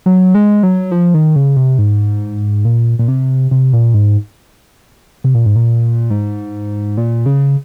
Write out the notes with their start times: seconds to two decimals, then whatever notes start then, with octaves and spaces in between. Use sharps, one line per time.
0.06 F#3
0.34 G#3
0.63 F#3
0.92 F3
1.14 D#3
1.36 C#3
1.57 C3
1.79 G#2
2.65 A#2
2.99 A#2
3.08 C3
3.51 C3
3.73 A#2
3.94 G#2
5.24 C3
5.35 A#2
5.46 G#2
5.56 A#2
6.11 G#2
6.97 A#2
7.26 C#3